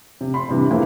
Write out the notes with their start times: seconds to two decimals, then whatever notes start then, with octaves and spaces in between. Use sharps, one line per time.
0.21 C3
0.34 B5 C6
0.49 G2 C3 E3
0.71 E3 A#3 C4 E4 G#4